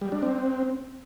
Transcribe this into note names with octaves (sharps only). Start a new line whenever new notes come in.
G3
D4
C4